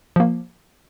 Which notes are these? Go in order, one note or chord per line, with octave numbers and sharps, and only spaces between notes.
F3 A#3